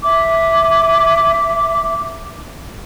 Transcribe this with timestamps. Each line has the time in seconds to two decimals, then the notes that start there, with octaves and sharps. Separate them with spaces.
0.03 E5 D6